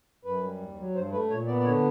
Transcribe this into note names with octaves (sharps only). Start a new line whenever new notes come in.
F#2 B4
G3
D#2
F#3
G2 C5
A3 B4
A#2 C#5
B3 D5
D5
D3 C#5